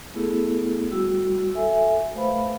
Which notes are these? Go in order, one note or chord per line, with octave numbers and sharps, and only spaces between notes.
A3 B3 E4 G#4 A4
G3 F#4 E6
A4 E5 G#5
A3 B4 C5 F5 B5